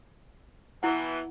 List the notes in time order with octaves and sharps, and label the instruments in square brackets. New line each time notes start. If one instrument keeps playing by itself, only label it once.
[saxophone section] B2 E3 [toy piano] E4 F#5